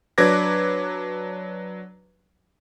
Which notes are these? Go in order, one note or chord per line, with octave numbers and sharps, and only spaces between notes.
F#3 D4 B4 D6 G#6 A#6